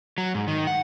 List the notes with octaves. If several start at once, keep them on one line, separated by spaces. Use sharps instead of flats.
F#3
G#2
D#3
F#5